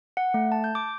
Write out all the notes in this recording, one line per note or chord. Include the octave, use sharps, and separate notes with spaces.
F#5
A3
A5
G6
D6